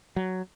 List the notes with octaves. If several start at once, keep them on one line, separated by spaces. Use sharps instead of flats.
F#3